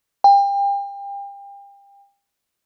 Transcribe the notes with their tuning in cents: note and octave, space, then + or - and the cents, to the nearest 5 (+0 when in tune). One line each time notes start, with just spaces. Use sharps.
G5 +35